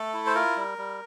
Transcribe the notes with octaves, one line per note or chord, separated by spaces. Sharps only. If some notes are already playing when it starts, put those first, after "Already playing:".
Already playing: A3 A4
E4
C5
F4 A#4
G3
G3